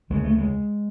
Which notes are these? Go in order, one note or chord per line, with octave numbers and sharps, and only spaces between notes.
D2 C#3 G#3
A3
G#3